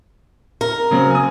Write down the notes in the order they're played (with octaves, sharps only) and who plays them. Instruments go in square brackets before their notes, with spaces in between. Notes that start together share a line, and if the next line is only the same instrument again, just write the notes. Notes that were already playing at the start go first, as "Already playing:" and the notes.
[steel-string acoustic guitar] A#4
[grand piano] C#3 F#3 C4
G#5 D#6